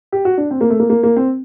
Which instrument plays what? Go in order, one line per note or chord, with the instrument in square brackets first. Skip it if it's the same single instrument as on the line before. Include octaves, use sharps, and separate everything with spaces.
[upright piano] G4
F#4
D4
C4
A#3
A3
A#3
A#3
A#3
C4